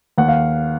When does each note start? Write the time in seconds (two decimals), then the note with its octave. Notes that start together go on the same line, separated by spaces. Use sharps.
0.18 D#2 F#5
0.28 F5